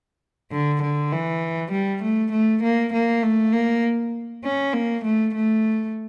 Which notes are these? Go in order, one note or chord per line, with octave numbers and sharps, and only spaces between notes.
D3
D3
E3
G3
A3
A3
A#3
A#3
A3
A#3
C#4
A#3
A3
A3